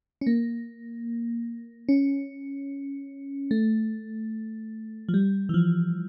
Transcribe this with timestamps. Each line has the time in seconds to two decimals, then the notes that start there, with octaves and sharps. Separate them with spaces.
0.21 C#4
0.27 A#3
1.89 C#4
3.51 A3
5.09 F3
5.14 G3
5.49 E3
5.54 F3